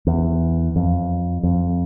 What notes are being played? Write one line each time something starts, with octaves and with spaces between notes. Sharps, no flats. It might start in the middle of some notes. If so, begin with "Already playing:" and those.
E2
F2
F2